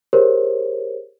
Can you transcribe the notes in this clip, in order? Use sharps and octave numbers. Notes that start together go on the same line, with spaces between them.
G4 G#4 A#4 C5 C#5